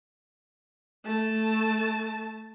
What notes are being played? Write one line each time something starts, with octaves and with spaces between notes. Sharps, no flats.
A3 A5